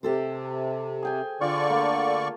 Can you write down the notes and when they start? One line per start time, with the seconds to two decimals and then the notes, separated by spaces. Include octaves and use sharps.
0.03 C3 G4 A4 C5
1.03 G#4 G5 G#5
1.41 D3 F4 D5 C#6
1.70 A3 A#3